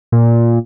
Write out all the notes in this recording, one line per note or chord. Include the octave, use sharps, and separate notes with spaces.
A#2